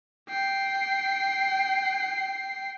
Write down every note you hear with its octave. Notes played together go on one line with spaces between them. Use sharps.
G5 C7